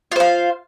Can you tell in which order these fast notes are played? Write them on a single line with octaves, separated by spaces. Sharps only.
F4 C5 F5